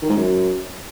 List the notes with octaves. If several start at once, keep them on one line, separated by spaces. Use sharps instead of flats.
D#3
G#2
F#2